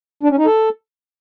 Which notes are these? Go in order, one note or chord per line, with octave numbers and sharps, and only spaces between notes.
D4
C#4
D#4
A4